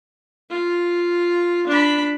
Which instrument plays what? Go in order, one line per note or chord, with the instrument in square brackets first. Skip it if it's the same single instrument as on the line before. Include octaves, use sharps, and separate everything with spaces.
[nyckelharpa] F4
D4 B5